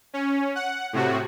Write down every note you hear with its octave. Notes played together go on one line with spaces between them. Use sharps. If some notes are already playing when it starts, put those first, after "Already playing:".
C#4
F#5
A2 C3 F#4